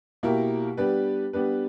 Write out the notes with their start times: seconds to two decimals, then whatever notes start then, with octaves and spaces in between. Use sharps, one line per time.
0.23 B2 A#3 E4 G4 A#4
0.77 G3 B3 D4 G4 B4
1.33 G3 B3 D4 G4 B4